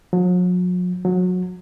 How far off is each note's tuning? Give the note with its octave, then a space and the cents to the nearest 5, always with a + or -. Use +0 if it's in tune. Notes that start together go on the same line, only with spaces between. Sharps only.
F#3 -45
F#3 -25